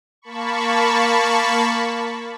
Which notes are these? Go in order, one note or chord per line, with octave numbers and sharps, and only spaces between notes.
A#3 A5 B5 C#6